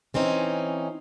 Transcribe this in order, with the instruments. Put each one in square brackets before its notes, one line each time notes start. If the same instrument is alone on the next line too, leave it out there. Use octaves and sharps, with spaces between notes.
[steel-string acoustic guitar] E3 C4 C#4 D#4